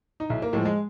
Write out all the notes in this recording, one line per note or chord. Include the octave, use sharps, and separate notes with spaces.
D#4
B1 E4
A#3
A2 F3 G#3
G#3